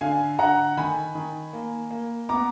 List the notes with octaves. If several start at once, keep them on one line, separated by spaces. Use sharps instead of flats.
D3 F5 G#5
D3 F#5 A#5
D#3 G#5 B5
D#3
A#3
A#3
B3 A#5 D6